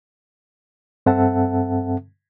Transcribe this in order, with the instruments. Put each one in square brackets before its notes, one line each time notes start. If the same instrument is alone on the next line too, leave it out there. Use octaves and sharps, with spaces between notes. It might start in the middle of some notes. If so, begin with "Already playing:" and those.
[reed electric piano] G2 C4 A4 E5 F#5 A5